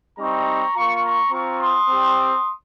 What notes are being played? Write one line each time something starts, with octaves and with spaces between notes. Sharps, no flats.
G3 C4 D#4 A#5 C#6
A#3 F4 A#5 C#6
A#5 C#6
C4 F4 A#5 C#6
C6 D#6
C4 G4